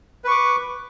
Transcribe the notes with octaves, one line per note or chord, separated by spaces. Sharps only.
B4 C#6 D6